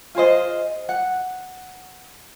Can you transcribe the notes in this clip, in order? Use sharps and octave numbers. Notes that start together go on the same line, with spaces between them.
F4 G#4 C5 D#5
F#5